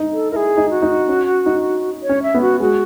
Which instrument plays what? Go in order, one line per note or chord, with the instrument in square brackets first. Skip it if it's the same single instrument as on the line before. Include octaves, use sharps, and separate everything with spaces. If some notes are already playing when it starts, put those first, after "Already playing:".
Already playing: [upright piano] D#4
[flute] A4
[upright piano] E4 [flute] G#4 A#4
[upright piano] D#4
[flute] F#4
[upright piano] D#4
C#4
D#4
[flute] C#5
[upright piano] C#4
[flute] E5
[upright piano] B3
[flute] F#4
[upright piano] G#3 [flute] F#4